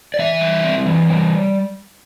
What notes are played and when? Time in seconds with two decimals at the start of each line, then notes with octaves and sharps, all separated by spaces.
0.14 D5
0.19 E3 E5
0.41 G3
0.64 C4
0.86 E3
1.09 G3